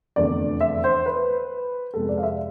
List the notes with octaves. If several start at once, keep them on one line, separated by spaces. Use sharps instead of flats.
F1 E2 D3 A3 D5
E5
C5
B4
F2 C3 G#3 B3 A4
D5
F5
E5